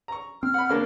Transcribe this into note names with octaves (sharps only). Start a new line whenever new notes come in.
A#5 C#6
C4 F6
F#5 B5
C#3 A#3 D4